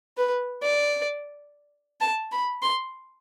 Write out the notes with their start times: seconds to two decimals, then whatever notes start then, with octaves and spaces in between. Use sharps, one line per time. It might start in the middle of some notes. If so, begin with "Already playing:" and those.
0.17 B4
0.63 D5
2.01 A5
2.32 B5
2.62 C6